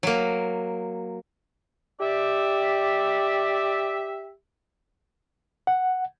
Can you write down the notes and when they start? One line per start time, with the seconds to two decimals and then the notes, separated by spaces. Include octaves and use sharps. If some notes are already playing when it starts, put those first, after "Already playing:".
0.03 F#3 A#3
2.01 G4 D5 E5
5.67 F#5